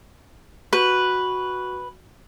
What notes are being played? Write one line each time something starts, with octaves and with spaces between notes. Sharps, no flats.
F#4 B4